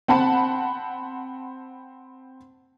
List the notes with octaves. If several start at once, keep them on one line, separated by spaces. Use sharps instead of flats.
C4 F#5 A5 B5